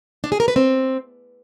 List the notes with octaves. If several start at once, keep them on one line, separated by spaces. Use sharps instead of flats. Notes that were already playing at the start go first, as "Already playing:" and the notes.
D4
G#4
A#4
B4
C4